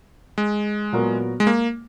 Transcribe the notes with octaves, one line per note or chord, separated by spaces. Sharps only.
G#3
A#2 F#3 B3 F#4 A#4
G#3
A#3